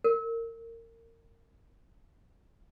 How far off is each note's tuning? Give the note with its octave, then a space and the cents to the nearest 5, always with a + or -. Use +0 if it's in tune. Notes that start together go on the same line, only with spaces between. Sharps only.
A#4 -30